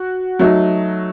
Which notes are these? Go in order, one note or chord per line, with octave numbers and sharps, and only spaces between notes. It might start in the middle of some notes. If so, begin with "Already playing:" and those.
Already playing: F#4
F#3 A3 D#4